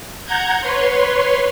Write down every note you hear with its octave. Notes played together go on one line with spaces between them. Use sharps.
F#5 A#5 G6 G#6
B4 C#5 C6